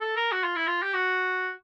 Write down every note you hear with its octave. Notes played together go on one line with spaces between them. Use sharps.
A4
A#4
F#4
F4
E4
F4
G4
F#4